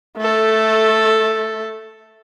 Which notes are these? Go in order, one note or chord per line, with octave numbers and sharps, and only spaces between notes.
A3 A4